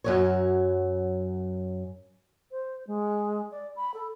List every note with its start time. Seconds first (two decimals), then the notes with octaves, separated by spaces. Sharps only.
0.04 F#2 F#3 C#5
2.51 C5
2.87 G#3
3.51 D5
3.76 B5
3.94 A4